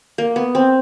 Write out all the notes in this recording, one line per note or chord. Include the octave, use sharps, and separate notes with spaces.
A#3
B3
C4